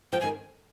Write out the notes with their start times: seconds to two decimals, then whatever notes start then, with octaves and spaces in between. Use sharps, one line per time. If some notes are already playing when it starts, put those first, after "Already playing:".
0.12 F3 G5
0.21 G#5
0.24 D#3